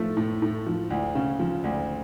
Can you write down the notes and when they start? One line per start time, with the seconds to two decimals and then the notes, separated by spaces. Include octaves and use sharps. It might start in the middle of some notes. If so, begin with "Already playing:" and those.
Already playing: A2 F3 A3
0.17 A2
0.42 A2
0.66 F3
0.90 D2
1.15 C#3
1.39 F3
1.64 D2